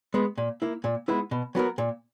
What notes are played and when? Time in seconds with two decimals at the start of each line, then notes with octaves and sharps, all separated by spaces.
0.14 G#3 B3
0.38 A#2
0.62 A#3 E4
0.84 A#2
1.08 G#3 B3 E4 B4
1.31 B2
1.55 F#3 B3 F#4 A#4
1.78 A#2